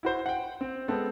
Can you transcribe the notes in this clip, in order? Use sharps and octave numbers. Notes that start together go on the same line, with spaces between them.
E4 F#4 C5
F#5 G5
C4
G#3 B3 C4 A4